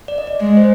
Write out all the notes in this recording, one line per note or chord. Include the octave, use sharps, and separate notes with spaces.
D5
D#5
D5
G#3 D#5
C5